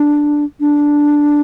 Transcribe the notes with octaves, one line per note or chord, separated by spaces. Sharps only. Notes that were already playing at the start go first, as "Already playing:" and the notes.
Already playing: D4
D4